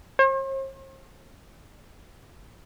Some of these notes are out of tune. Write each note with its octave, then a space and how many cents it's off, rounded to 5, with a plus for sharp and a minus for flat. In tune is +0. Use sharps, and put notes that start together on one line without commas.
C5 +45